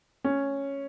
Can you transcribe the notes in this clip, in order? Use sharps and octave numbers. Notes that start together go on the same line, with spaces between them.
C#4